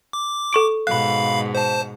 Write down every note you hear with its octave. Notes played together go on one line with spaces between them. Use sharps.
D6
A4 C#6 D7
G#2 B2 F5 B5 F#6
C5 A5